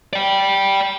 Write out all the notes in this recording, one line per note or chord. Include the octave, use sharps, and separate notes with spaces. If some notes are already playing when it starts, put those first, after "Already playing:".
D5 G5